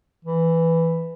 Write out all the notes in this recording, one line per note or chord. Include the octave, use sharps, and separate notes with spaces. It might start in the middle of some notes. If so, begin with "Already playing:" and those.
E3